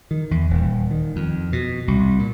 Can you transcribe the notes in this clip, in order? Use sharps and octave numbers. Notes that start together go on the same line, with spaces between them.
D#3
E2
D#1
D#3
F2
B2
C2
A#2